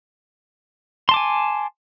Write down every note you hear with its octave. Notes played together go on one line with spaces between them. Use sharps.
G#5 A5 C6 D6